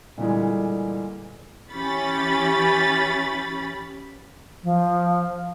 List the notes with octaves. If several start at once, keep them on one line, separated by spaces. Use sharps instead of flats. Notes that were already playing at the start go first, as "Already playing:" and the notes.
A#2 D3 E3 G3 G#3
E3 C#4 G4 B5 A6
F3